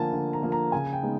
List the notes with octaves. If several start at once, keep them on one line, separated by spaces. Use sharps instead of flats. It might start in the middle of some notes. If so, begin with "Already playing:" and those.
Already playing: D3 F3 A#3 G#5 A5
D3
A#5
F3 A#3
A#5
C#3 G#5
G5
G#3 B3 D#4